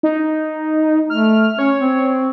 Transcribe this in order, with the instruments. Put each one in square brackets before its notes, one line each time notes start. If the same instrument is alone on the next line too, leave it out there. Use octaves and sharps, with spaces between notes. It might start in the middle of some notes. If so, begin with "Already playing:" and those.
[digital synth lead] D#4
[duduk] A3 [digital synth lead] F6
[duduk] C#4 [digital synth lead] C#5
[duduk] C4